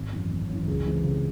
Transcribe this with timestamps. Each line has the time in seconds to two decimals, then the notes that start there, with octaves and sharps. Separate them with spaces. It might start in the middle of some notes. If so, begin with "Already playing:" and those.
Already playing: G#1
0.13 F#2 E3
0.31 G#1
0.49 F#2 E3
0.67 C#2
0.86 C3 E3 G#3 C4
1.04 C#2